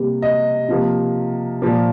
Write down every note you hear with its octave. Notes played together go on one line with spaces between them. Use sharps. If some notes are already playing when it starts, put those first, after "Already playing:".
Already playing: C3 G3 A#3
D#5
C3 F3 A#3
A#2 F3 A#3